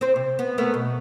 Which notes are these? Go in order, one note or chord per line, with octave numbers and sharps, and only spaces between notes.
C4 C5
C3
B3
A3 B3 A#4
B2